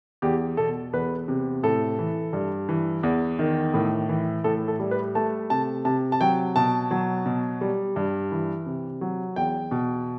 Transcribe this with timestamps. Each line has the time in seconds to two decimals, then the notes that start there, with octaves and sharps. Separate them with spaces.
0.22 E2 G4
0.57 B2 A4
0.93 E2 B4
1.28 C3
1.63 A2 A4
1.99 E3
2.33 G2
2.69 E3
3.03 E2
3.39 D#3
3.74 A2
4.09 E3
4.44 A2 A4
4.68 A4
4.80 G3
4.91 B4
5.15 A3 A5
5.50 C3 A5
5.85 C3 A5
6.12 A5
6.21 F#3 G5
6.56 B2 A5
6.91 F#3
7.25 B2
7.61 G3
7.96 G2
8.32 E3
8.66 C3
9.01 F#3
9.36 E2 G5
9.71 B2